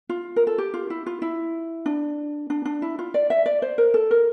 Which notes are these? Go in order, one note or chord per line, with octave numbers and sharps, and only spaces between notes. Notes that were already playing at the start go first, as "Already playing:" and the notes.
F4
A#4
A4
G4
F4
E4
F4
E4
D4
D4
D4
E4
F4
D5
E5
D5
C5
A#4
A4
A#4